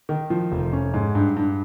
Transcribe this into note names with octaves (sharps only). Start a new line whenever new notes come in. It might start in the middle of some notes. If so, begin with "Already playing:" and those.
D#3
F3
F1
C#4
G#2
G2
G2